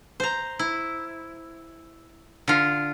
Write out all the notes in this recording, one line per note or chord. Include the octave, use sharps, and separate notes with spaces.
C5 A#5
E4
D3 F4